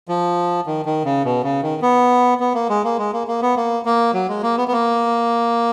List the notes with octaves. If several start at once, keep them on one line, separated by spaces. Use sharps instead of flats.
F3
D#3
D#3
C#3
B2
C#3
D#3
B3
B3
A#3
G#3
A#3
G#3
A#3
A#3
B3
A#3
A#3
F#3
G#3
A#3
B3
B3
A#3